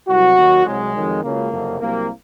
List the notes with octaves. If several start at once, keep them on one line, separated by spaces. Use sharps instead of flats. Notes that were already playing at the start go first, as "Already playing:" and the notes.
C2 C3 F#3 F#4
D#2 D#3 F#3
C2 C3 F#3 G#3
F2 D#3 F#3
C#2 C#3 F#3 A#3
F#1 F2 C3 F#3
C2 C3 F#3 A#3